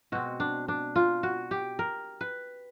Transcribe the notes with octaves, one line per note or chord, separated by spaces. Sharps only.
B2 G#3 C4 F#4
D4
D4
F4
F#4
G4
A#4
B4